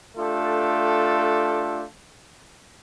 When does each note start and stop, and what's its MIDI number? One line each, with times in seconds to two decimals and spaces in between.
0.17 1.83 57
0.17 1.83 62
0.17 1.83 65
0.17 1.83 67
0.17 1.83 69